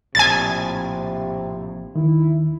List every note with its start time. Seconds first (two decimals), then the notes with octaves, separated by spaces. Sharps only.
0.15 A#1 A2 C3 G#5 A6
1.95 D#2 D#3 E4